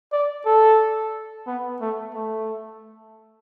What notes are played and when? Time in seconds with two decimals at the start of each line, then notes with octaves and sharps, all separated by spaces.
0.12 D5
0.46 A4
1.47 B3
1.81 A3
2.14 A3